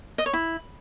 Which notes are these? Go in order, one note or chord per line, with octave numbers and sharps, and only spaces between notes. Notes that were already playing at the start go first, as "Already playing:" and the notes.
D#5
C#5
E4